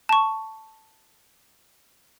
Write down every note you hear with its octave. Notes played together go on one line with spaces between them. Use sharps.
A5 C#6